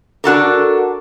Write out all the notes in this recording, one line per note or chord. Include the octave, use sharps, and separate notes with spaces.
D4 F#4 A4 A#4